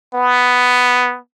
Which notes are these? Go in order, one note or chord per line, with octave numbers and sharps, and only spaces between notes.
B3